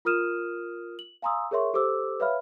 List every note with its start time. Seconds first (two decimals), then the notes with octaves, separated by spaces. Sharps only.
0.05 F4 A#4 D#6 F6 D#7 E7
0.99 F#7
1.22 F5 G#5 A#5 C6 D#6 E6
1.51 G#4 A#4 C#5 E5 C6 C#6
1.74 G4 A4 C5 D6 E6
2.20 B4 C#5 E5 F5 B5 F6